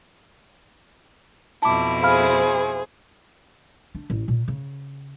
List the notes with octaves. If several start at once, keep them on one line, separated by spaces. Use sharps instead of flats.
F2 B2 E4 A5 D6
G#4 C5 F5 B5 F6
D4
A1
A#2
C#3